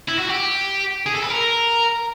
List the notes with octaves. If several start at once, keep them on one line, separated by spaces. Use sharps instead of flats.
E4
F#4
G4
G#4
A4
B4
A#4